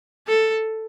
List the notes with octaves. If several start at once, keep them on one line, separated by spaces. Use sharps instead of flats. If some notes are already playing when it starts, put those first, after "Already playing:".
A4